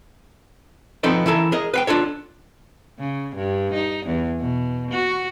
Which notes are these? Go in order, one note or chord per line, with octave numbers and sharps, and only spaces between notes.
F3 B3 C4 D#4 A4 D5
E3 E4 A4 A#4
G#4 A#4 D#5
B4 F5 G5
D4 F4 A4 C#5
C#3
G2
D#4
E2
B2
F#4